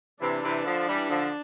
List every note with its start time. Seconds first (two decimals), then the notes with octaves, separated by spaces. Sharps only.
0.21 C3 E3 D4
0.43 C3 E3
0.65 D3 F3
0.87 E3 G3
1.10 D3 F3